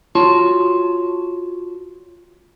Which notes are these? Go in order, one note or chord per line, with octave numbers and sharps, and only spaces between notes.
F4 F#4 C#5 A5 C6